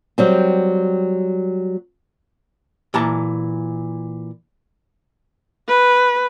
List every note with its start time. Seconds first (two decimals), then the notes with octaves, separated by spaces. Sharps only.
0.18 F#3 G3 C4
2.94 A#2 E3 A5 A#5
5.68 B4